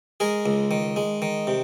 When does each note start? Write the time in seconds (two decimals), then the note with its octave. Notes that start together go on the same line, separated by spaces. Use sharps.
0.20 G#3 G#4 A#4
0.46 C#2
0.71 D#3
0.96 G#3
1.22 D#3
1.47 C3